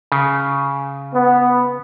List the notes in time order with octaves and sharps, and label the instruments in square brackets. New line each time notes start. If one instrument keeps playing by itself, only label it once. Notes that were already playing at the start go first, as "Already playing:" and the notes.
[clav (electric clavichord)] C#3
[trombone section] B3